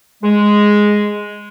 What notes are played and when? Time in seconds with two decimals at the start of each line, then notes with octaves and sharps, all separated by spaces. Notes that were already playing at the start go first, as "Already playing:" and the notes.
0.23 G#3